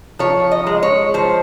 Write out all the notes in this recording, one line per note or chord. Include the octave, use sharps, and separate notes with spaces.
F3 C#5
D#5
G#3
C#5
F3 C5